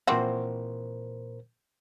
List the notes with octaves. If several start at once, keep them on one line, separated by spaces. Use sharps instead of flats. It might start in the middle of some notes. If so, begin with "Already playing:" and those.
A#2 E3 C4 F#4 A#4 C5